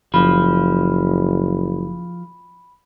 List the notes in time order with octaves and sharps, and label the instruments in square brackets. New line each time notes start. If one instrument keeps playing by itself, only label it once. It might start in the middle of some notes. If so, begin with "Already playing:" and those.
[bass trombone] F#1 [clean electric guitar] F3 [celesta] B5